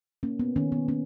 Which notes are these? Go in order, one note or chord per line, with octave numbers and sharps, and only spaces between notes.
A#3 C#4
B3
D#3 C#4
B3
A#3 C#4